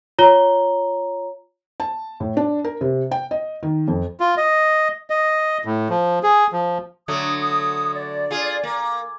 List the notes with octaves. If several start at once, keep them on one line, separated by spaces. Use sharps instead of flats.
F4 C#5 A#5 G7
A5
A2
D4
A#4
C3
G5
D#5
D#3
F2
F4
D#5
D#5
A2
F3
G#4
F3
D3 F#3 A3 D#6
D#6
D5
F4 G#4
A#3